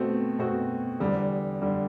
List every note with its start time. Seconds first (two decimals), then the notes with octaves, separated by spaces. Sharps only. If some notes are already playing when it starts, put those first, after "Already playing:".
Already playing: B2 A3 C4 F#4
0.39 B2 A3 C4 F#4
1.00 E2 D3 G3
1.62 D3 G3